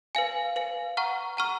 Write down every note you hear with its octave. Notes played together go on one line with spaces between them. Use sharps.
B4 F5 G#5
B4 F5 G#5
F#5 A#5 C#6 F6
F#5 A#5 C#6 F6